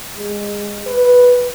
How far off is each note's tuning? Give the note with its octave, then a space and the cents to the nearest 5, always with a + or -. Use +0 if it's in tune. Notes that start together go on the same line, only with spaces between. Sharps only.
G#3 -20
B4 -5